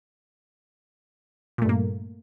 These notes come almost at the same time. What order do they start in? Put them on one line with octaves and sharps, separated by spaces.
A#2 A3 G2 A#3